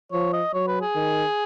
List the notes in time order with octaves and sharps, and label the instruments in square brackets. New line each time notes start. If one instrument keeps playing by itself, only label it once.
[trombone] F3 [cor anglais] C#5
[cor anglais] D#5
[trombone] F#3 [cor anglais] C#5
[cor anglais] B4
G#4
[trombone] D#3